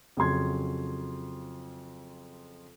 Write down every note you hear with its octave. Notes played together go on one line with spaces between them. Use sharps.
F2 C#3 F#3 C6 G#6